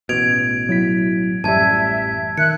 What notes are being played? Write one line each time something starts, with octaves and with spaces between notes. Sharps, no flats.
A1 B2 G#6 D7 F7
F#3 E4 B6
A1 F#2 G3 E5 A5 G#6
D#3 E5 F#6 C#7